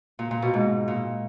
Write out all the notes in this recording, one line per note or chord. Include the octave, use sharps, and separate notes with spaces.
A#2
A#2
B2
G#2
A#2